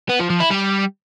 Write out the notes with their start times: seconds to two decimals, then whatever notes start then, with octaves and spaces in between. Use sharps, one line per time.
0.09 B3
0.19 F3
0.30 F3
0.40 E4
0.51 G3